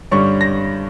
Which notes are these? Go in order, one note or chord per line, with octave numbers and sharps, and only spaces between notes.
G2 D3 G3 C#4 C#6
A#6